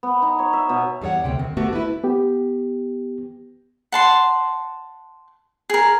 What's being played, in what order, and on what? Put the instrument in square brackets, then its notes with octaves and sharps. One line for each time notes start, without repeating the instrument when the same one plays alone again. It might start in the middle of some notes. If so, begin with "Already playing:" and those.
[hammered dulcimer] B3
D#4
C#5
E5
B2
[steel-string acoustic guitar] E2 G3 A4 C#5 F#5
D2 C3 G5
D#3 C4
A3 B3 C#4 F#4 G4
E4 B4
[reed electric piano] B3 G4
[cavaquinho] F#5 A5 C6
G#4 A#4